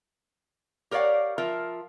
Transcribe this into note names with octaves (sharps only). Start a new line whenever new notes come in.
G4 A#4 C#5 D5 F5 F#5
F3 F4 A#4 E5